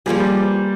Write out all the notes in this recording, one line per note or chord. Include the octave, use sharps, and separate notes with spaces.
F3 G3 A#3 F4 G#4
G3